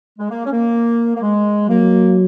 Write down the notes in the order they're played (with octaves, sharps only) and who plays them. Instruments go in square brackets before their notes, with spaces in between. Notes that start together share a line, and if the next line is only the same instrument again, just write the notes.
[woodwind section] G#3
A#3
C#4
A#3
A#3
G#3
[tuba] F#3 [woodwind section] A#3